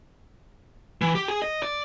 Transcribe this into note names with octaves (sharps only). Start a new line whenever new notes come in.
E3
G4
G#4
D#5
D5